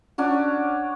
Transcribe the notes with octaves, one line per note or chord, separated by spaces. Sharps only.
C#4 D4 F#4